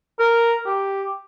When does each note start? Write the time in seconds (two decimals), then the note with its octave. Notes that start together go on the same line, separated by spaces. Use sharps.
0.19 A#4
0.66 G4